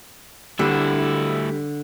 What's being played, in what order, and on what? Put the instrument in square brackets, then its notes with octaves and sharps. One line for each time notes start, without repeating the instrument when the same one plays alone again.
[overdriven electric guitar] D2 E4 [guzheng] D3 [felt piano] G3